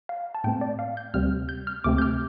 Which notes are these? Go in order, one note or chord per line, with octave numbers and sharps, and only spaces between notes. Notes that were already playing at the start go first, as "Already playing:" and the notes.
F5
A5
A2 A3 C4 G5
D5
F5
G6
D2 C3 G3 C4 F6
G6
F6
D2 C3 A3 C4 D6
G6
F6